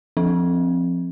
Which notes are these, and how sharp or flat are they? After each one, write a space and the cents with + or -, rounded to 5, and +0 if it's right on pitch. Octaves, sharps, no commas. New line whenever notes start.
F3 +0 C4 +0